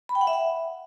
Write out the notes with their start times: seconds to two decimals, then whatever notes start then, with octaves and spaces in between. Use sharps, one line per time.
0.09 B5
0.15 G5
0.21 F#5
0.27 E5
0.33 F#5